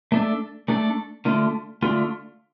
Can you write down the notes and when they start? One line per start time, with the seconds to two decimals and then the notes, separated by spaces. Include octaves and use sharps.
0.12 A3 D4 A4
0.68 A3 D4 A4
1.25 D3 A3 F4
1.82 D3 A3 F4